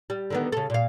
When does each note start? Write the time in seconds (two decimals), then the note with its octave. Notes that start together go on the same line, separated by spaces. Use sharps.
0.10 G3
0.30 D3 D#3 B3
0.52 C#3 A4
0.70 A#2 F5